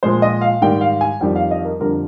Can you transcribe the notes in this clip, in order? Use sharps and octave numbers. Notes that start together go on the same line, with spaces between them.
A#2 F3 G#3 C5
D#5
F5
G#2 D#3 G3 G5
F5
G#5
F2 D#3 G3 G5
F5
D#5
A#4
F2 D3 G3 A#4